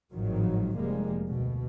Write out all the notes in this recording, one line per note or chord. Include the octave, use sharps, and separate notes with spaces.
G#1 A2 D#3 F3 F#3
F1 F3 G3 G#3 A#3
D2 B2